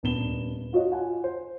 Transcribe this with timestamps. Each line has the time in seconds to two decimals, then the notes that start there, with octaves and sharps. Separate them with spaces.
0.03 D#1 B3 D4 E7 G7
0.73 F4 F#4 C#5 D#5
0.91 F4 F#5 G#5
1.24 C5